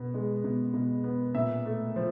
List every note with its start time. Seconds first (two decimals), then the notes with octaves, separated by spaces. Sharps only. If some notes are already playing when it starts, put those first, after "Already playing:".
Already playing: B2 B3
0.14 G#3
0.44 B2
0.74 B2
1.04 B3
1.35 A#2 E5
1.66 A3
1.96 F3